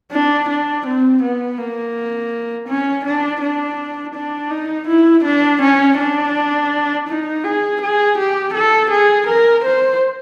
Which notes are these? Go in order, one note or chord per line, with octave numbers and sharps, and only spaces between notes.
D4
D4
C4
B3
A#3
C#4
D4
D4
D4
D#4
E4
D4
C#4
D4
D#4
G#4
G#4
G4
A4
G#4
A#4
C5